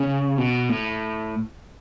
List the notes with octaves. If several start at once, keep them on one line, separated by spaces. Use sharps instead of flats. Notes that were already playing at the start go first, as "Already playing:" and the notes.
Already playing: C#3
B2
A2